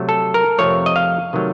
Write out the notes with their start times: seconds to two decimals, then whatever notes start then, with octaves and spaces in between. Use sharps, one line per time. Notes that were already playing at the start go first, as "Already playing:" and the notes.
Already playing: C3 F#3 A3
0.09 A4
0.34 A#4
0.58 F2 C3 F3 A3 C#5
0.86 D#5
0.96 F5
1.33 C3 D#3 F#3 A3